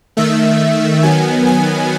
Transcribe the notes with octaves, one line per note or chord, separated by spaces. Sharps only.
D#3 A3 E5
D#3 F#3 B3 G#5
G#5